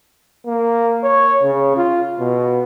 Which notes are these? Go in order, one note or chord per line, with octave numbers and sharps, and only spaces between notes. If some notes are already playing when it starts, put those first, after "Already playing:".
A#3
C#5
C#3
F4
B2